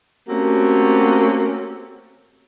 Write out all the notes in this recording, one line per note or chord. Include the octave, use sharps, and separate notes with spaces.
A3 A#3 C4 C#4 F#4 G4